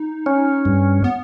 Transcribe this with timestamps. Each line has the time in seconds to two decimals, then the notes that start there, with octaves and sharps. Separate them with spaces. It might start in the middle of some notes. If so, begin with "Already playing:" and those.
Already playing: D#4
0.26 C#4
0.65 G2
1.04 B3